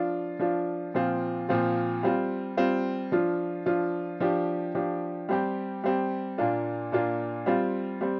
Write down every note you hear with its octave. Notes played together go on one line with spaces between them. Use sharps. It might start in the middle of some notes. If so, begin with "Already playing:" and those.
Already playing: F3 D4 F4
F3 D4 F4
A#2 F3 C4 F4
A#2 F3 C4 F4
G3 C4 F4
G3 C4 F4
F3 D4 F4
F3 D4 F4
F3 D4 G4
F3 D4 G4
G3 C4 G4
G3 C4 G4
A#2 A#3 D4 F4
A#2 A#3 D4 F4
G3 C4 F4
G3 C4